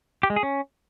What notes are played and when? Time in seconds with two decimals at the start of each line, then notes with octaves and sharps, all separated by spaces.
0.23 G4
0.30 G#3
0.36 G#4
0.43 C#4